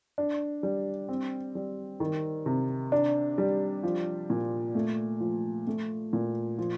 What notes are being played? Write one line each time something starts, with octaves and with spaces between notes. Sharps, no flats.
D4
G3
C4
G3
D#3
C3
D4
G3
F3
A#2
A3
F3
A3
A#2
F3